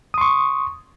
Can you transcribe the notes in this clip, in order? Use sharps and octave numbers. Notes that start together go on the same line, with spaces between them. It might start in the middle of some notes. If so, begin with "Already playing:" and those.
C6 C#6 D#6